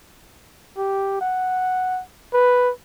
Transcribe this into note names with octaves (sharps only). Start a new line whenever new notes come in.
G4
F#5
B4